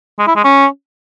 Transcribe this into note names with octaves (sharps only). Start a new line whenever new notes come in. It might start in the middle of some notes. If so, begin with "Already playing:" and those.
G#3
E4
G#3
C#4